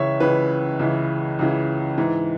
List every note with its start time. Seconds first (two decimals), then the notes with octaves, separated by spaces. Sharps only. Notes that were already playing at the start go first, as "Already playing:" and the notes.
Already playing: C#2 C#3 E3 C#5 E5
0.20 C#2 C#3 E3 B4
0.79 C#2 C#3 E3
1.39 C#2 C#3 E3
1.98 G#2 E3